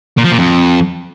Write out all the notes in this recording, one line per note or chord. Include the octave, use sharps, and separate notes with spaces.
A#2
F3
A#2
F2